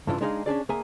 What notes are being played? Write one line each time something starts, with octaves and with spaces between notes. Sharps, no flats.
G2 C#3 E3 D4 F4
G#3 D4 D#4 G#4 C#5 F5
C#4 D4 G#4 D5
D2 A#3 G#4 E5 G#5